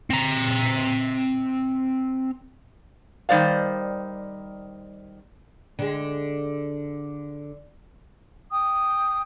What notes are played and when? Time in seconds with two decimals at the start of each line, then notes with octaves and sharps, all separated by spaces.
0.10 C4 A#5
3.29 D#3 G3 C5 D5 F5
5.79 D3 G#3
8.50 G5 D#6